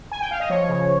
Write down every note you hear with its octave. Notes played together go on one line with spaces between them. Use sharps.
G#5
G5
F5
D#5
F3 C#5
C#3